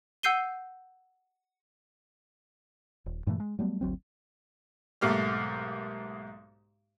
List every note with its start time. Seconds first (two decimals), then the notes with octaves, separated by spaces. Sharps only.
0.23 F#5 E6 G6 C7 D#7 G7
3.06 D#1
3.27 G2 A#2 E3 A3
3.40 G#3
3.59 F#3 G3 A3 B3
3.81 G1 D2 F#3 C4
5.01 B1 G#2 A3 A#3 G4 F6